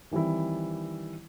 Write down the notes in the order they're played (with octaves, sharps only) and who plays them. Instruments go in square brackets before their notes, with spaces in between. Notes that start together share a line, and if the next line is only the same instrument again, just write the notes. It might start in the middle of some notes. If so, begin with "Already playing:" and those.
[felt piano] D#3 E3 G3 C4 E4